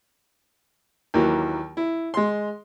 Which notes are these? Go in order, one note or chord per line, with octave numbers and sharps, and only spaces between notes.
D#2 E3 F#3 A#3
E4
G#3 C6